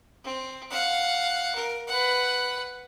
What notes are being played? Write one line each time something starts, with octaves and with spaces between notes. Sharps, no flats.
C4
F5 F#5
A#4
B4 F#5